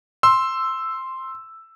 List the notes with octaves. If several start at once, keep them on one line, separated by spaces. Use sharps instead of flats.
C6 E6